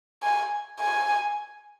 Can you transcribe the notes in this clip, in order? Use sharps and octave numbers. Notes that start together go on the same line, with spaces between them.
G#5
G#5